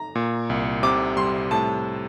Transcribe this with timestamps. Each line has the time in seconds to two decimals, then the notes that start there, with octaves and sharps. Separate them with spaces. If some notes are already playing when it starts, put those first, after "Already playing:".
Already playing: A#5
0.15 A#2
0.50 C2
0.83 C3 D6
1.17 G3 C6
1.51 A2 A5